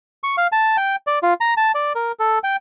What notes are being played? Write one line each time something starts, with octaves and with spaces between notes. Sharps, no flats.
C#6
F5
A5
G5
D5
F4
A#5
A5
D5
A#4
A4
G5